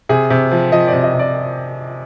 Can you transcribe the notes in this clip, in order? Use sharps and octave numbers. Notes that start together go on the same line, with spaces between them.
C3 G#4
C3
F3
F3 D#5
C3 D5
D#5
C3
D5